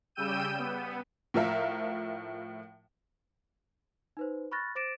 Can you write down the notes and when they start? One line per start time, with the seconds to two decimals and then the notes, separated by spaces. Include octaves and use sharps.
0.15 C#3 G3 G5 E6 G6 D#7
0.59 B3
1.34 A2 F3 A#4 E5 F5
4.17 D#4 B4 C5
4.52 B5 C#6 F6 F#6 A6 A#6
4.75 C5 D6 A6 A#6 D7 E7